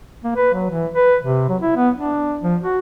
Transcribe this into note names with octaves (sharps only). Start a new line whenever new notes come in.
A#3
B4
F#3
E3
B4
C3
F#3
E4
B3
D4
F3
F#4